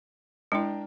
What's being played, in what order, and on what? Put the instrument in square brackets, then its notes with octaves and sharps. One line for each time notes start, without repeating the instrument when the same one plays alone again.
[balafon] G#3 E4 [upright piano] D4 A#4 G5